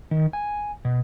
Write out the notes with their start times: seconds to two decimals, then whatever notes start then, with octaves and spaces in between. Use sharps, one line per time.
0.11 D#3
0.33 G#5
0.85 B2